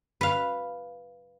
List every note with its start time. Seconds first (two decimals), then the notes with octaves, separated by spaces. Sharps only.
0.21 B4 F5